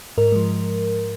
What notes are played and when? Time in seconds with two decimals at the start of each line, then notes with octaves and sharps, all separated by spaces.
0.18 G#2 A#4
0.32 F3 G#3